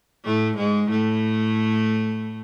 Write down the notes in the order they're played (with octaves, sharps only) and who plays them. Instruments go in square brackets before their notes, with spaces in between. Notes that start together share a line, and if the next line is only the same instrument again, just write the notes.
[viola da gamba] A2 A3
G#2 G#3
A2 A3